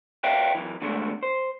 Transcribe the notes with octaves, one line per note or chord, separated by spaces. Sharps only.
B4 C#5 E5 F5 G5
F#2 E3
E2 D3 G#3 A3
C5